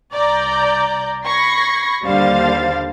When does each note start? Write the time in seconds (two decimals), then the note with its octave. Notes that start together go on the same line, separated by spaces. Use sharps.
0.12 C2 D5 A#5 G6
1.26 B5 C#6 G#6 A#6 C7
2.04 D#2 D3 G3 C5 F5 A6